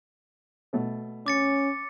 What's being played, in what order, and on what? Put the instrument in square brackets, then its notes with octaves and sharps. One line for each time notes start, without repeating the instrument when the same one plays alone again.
[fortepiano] B2 A3
[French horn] C#4 [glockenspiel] D6 A6 C#7